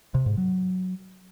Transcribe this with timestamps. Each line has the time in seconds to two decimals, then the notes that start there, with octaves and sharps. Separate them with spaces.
0.15 C3
0.26 G#2
0.37 F#3